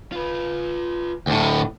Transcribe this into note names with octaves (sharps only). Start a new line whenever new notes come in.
F4 B4
D2 A2